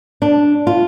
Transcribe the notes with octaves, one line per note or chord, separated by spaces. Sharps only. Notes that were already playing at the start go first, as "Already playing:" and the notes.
D4
F4